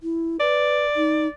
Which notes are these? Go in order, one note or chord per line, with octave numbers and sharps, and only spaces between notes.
E4
B4 D5
D#4